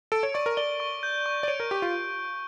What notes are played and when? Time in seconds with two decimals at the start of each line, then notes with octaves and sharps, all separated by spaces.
0.12 A4 D7
0.23 C#5
0.34 D5 C#6
0.46 A#4
0.57 D5 G7
0.80 C#6
1.03 G6
1.26 C#6
1.43 D5
1.48 C#5 D7
1.60 A#4
1.71 G4 C#6
1.82 F4